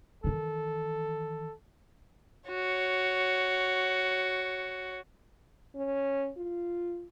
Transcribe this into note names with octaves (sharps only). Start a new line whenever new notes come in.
D#3 E3 A4
F#4 C#5
C#4
F4